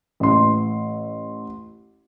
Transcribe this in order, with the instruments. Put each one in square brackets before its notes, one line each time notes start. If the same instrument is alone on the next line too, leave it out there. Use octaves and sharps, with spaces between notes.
[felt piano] A1 C6